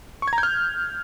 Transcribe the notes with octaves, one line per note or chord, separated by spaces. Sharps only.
C#6
G#6
A#5
G6
F6